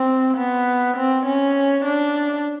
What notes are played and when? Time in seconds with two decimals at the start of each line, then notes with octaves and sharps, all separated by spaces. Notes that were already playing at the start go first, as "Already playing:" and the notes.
Already playing: C4
0.37 B3
0.96 C4
1.26 C#4
1.85 D4